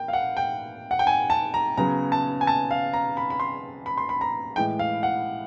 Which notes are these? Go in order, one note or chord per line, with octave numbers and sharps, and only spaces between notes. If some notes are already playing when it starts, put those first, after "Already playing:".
Already playing: A#3 G5
F5
F#5
G5
F#5
G5
G#5
A5
A#5
C#3 F#3 B3 A#5
A5
G#5
A5
F5
A#5
B5
B5
C6
B5
C6
B5
A#5
A2 E3 G#3 G5
F5
F#5